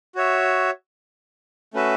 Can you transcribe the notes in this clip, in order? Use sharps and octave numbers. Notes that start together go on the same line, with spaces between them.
F#4 C#5 E5
A3 C#4 F#4 B4 E5